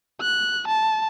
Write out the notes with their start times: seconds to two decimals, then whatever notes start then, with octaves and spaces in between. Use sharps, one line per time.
0.21 F#6
0.68 A5